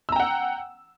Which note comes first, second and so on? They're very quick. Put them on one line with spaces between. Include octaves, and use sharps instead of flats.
E6 A#5 G5 F#5